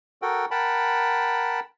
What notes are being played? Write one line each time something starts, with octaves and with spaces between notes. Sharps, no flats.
F#4 A4 A#4 F#5 G5
A#4 F#5 G5 A5 B5